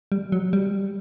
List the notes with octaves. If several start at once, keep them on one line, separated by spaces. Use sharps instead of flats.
G3
F#3
G3